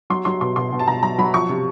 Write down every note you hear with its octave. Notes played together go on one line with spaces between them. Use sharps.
F#3 C6
F#3 C6
B2 C6
B2 C6
B2
A5
B2 A#5
F#3 A#5
F#3 B5
F3 C#6
C3